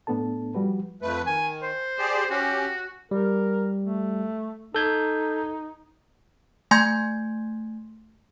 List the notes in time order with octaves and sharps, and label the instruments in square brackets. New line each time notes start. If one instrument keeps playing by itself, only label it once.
[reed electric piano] A2 A3 B3 D4 A4 A5
F3 G3 F#4 B4
[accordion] F2 A3 B4
[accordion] D#3 [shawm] G#5
[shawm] C5
[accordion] G4 G#4 D5
[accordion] C#4 G4 [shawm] F#4
[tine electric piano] G3 [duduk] A#4
[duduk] A3
[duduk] D#4 [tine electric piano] A4 G6 G#6
[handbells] A3 G#5 C6 G6 G#6